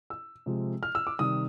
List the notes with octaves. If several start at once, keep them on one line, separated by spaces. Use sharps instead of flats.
E6
C3 F3 G#3
F6
E6
D6
C3 D#3 G3 D#6